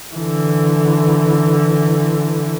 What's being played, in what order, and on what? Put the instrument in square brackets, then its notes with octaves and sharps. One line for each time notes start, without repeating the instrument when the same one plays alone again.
[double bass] D3 E3